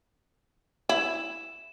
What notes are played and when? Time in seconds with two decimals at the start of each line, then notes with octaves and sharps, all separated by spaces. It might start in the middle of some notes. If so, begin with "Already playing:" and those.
0.89 E4 E7